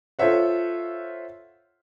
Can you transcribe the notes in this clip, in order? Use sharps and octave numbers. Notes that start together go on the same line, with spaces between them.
F4 A4 C5 C#5 E5 F#5